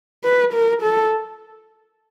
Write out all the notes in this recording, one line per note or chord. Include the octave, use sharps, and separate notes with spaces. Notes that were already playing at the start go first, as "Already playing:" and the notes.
B4
A#4
A4